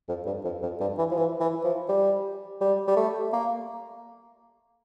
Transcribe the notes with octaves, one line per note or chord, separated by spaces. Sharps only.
F2
G2
F2
F2
G2
E3
F3
E3
E3
F3
G3
G3
G3
A3
A#3